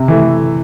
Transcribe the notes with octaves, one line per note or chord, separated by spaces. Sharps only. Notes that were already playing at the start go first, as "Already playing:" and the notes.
Already playing: C3
E3 A3